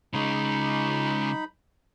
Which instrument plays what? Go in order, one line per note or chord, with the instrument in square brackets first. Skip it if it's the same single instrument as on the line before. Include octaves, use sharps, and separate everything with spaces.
[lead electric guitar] C#3 G#3 [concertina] D#4 B5